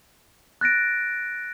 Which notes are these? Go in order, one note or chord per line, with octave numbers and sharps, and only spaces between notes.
F#6 A6 A#6 D7